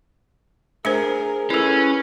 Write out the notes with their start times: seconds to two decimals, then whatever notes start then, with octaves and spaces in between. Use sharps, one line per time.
0.85 A3 D4 G#4 A#4 C5
1.50 C#4 E4 A4 B4